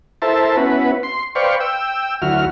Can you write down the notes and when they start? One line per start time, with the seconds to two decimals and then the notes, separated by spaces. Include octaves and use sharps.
0.22 E4 A4 A#4 C5 E5 A5
0.57 B3 C#4 E4 F#4 B4
1.03 C6
1.35 B4 C5 D5 F5 G5 C#6
1.60 G5 E6
2.22 D2 F#3 E4 F#4 F6